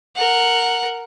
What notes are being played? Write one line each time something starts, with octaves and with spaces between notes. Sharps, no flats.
A#4 F#5